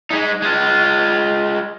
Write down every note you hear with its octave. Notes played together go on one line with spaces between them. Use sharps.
G#3 D#4
G#3 F4